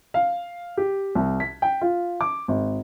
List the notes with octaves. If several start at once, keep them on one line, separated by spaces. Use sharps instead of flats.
F5
G4
C2
B6
G5
F4
D6
G#1